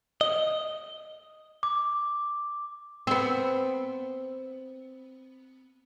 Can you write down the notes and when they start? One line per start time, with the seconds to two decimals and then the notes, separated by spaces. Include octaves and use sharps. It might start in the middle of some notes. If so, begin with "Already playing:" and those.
0.21 D#5
1.63 D6
3.07 B3 C4